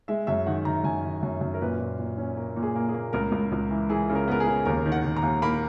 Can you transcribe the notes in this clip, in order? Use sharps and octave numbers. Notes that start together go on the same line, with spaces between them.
G#3 E5
F#2 E5
D#3 F#5
D#3 A#5
F#2 G#5
D#3
F#2
F#2
A#4
A#2 B4
A#2
A#2
C#4
A#3
A#2
G#4
A#3
G#4
A#3
C#2 A#4
C#2
C#2
E3
E3 G#4
C#3
A#4
B3 A#4
G#4
C#3
D#2 A#4
D#3
F#5
D#3
A#5
D#2
A#3 B5